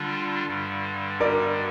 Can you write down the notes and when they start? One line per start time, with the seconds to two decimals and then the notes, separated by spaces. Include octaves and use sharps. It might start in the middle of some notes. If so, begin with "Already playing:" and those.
Already playing: D3 G3 D4 F4
0.45 G2 D3 G3
1.20 A#4 D5